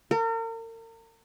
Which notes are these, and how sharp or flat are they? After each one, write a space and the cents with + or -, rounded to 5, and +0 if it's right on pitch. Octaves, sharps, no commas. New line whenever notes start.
A#4 -40